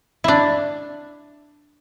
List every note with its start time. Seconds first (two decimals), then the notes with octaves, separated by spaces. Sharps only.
0.24 D4 E4